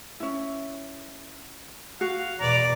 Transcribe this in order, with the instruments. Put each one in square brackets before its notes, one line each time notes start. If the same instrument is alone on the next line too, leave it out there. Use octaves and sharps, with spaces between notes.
[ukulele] C#4 E4
[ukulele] F#4 [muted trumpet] F5
[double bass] E2 B2 [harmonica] D5 [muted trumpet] A#5